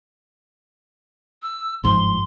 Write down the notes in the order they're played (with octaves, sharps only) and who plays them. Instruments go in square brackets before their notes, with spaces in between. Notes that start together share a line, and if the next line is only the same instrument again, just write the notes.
[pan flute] E6
[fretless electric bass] G1 G#2 F3 [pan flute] C6